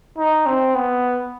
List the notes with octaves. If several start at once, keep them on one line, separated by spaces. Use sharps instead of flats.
D#4
C4
B3